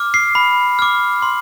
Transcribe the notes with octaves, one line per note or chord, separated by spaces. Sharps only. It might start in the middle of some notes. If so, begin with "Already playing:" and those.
Already playing: D6 F6
C7
B5
D6 F6
C6